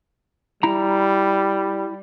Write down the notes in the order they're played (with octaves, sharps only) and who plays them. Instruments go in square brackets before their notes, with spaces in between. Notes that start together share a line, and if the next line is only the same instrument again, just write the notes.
[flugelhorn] G3 [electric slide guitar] E4 A#5